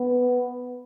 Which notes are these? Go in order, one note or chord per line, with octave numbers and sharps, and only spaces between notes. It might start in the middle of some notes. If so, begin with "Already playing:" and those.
Already playing: B3